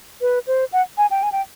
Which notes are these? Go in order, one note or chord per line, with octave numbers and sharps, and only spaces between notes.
B4
C5
F#5
G#5
G5
G#5
G5